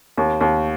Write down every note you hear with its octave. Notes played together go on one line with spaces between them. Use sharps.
D#2
D#2